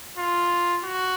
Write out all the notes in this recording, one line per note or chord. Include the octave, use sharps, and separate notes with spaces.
F4
F#4